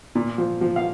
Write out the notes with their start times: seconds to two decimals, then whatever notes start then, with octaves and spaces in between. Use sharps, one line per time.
0.15 A#2
0.38 F3
0.61 F3
0.76 F5